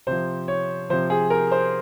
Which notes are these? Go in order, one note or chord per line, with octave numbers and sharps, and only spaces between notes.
C3 F3 C5
C#5
C3 F3 C5
G#4
A#4
C5